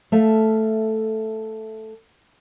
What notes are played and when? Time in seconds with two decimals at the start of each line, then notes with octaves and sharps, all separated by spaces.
0.12 A3 A4 E5 F5